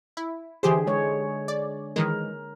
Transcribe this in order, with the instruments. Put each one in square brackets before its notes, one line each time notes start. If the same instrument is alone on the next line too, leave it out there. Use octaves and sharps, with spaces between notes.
[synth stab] E4
[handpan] D3 G#4 [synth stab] E3 G4 C5
[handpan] G#3 G#4 C#5
[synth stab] D5
[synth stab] D#3 E3 G#3 [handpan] A#4